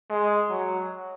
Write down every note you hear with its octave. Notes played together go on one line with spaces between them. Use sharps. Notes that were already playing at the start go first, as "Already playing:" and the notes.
G#3
F#3